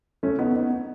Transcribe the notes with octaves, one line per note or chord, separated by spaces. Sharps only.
A3 C#4
B3 D#4
B3 D#4